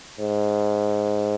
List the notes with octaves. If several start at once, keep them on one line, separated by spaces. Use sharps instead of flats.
G#2